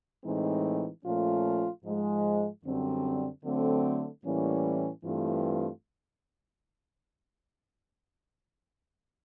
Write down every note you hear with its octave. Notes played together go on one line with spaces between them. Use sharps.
A2 E3 G#3 C4 D#4
A#2 F3 A3 C#4 F4
G#2 F3 G#3
F#2 D3 G3 C4
D3 F#3 A3 C4
A2 E3 G3 A#3 C#4
G2 E3 A3 C4 F4